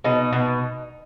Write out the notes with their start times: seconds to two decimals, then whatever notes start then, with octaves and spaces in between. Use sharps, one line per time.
0.04 B2 D#4
0.33 B2